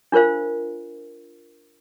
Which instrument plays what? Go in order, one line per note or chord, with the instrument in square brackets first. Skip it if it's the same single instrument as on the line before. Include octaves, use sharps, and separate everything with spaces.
[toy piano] D4 F4 A#4 C5 F5